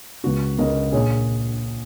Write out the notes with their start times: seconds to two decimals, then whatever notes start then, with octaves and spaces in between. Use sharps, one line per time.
0.24 C#2 C#3 F#4
0.58 C#2 C#3 A#4 D#5
0.92 A#1 A#2 G#4 C#5